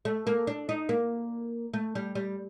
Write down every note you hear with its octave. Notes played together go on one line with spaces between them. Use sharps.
A3
A#3
D4
D#4
A#3
A3
G3
G3